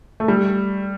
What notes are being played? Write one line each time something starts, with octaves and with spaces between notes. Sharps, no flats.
A3
G3